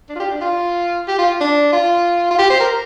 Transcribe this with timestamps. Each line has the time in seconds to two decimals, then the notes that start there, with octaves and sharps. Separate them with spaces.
0.09 D4
0.16 F4
0.20 G4
0.31 D4
0.41 F4
1.08 G4
1.19 F4
1.41 D4
1.73 F4
2.31 F4
2.39 G4
2.50 C5
2.60 A#4